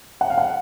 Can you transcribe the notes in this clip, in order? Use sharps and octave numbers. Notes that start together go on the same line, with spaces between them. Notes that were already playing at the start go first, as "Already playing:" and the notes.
F#5
F5
F#5